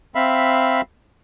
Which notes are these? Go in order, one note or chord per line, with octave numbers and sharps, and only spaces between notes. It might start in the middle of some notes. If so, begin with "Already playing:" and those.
C4 E5 F5 B5